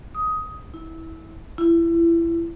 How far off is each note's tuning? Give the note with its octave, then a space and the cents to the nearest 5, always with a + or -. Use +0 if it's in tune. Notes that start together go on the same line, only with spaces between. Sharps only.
D#6 +15
E4 -25
E4 +25